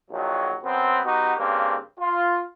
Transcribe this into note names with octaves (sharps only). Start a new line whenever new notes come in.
A#1 D#3 F#3
F#2 B3 C4
B3 D#4 F#4 G4
G2 C#3 A#3 C4
F4